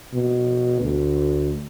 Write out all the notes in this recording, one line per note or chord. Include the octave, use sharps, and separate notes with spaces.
B2
D2